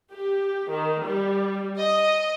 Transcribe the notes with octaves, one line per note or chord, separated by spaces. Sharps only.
G4
D#3
G3
D#5